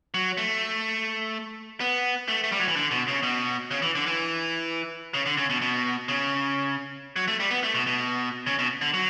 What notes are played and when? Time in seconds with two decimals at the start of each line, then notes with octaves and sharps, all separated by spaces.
0.14 F#3
0.37 A3
1.80 B3
2.28 A3
2.44 A3
2.52 G3
2.60 F#3
2.68 E3
2.76 D3
2.91 B2
3.08 C#3
3.23 B2
3.71 C#3
3.82 E3
3.95 D3
4.06 E3
5.14 C#3
5.26 D3
5.37 C#3
5.50 B2
5.61 B2
6.08 C#3
7.16 F#3
7.28 A3
7.40 G3
7.51 B3
7.63 A3
7.74 B2
7.87 B2
8.47 C#3
8.59 B2
8.81 D3
8.94 F#3